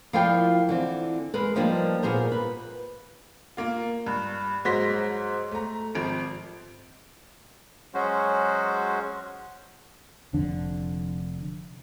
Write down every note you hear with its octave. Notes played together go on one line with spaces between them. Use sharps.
F3 E4 F4 A#4 D5 G5
D3 E3 C4
G#3 A#4 B4
F3 G3 A#3 D4 D#4
A#2 B3 G#4 A#4 C5
B4
A#3 F4
G2
G#2 F#3 C5 C6 A#6 B6
A3 A#5
G#1 F3 D7
F#3 G#3 C#4 F#4 C5
F1 F2 D3 D4